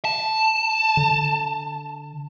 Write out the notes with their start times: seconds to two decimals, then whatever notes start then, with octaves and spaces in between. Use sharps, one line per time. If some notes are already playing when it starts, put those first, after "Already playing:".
0.05 A5
0.97 D3